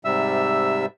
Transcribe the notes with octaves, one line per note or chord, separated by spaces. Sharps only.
G#2 C3 G3 E5 E6